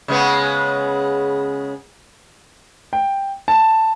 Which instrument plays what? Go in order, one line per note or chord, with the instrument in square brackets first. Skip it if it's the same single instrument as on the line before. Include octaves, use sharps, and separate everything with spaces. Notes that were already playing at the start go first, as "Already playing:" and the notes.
[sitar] C#3 G#3 B3
[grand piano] G5
A5